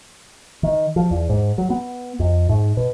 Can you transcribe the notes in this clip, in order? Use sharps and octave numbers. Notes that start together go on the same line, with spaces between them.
D#3
F3
E2
G#2
F#3
B3
F2
G#2
B2